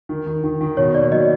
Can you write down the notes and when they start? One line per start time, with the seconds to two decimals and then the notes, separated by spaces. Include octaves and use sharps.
0.09 D#3
0.27 D#3
0.44 D#3
0.61 D#3
0.77 B2 C#5
0.95 A#3 D5
1.11 F#3 D#5